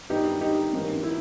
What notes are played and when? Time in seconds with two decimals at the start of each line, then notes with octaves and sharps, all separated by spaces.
0.10 G2 D#3 G3 B3 D#4 G4
0.41 D#4 G4
0.73 G#2 E3 A#3 C#4
1.03 E4